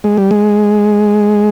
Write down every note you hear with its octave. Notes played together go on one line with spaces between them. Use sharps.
G#3
G3
G#3